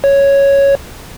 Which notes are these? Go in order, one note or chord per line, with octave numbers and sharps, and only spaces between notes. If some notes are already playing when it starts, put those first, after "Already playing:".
C#5